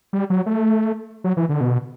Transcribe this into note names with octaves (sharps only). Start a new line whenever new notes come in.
G3
F#3
A3
F#3
E3
D3
B2